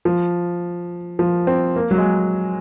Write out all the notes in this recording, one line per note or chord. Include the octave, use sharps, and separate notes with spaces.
F3
F3
C4
A#3
F#3
G#3